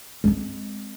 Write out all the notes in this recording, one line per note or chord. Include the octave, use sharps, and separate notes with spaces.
G#3 C4